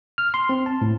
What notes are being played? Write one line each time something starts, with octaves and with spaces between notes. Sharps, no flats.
F6
C6
C4
A5
A2